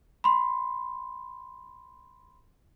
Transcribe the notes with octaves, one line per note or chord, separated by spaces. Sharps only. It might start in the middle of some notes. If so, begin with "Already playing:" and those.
B5 C6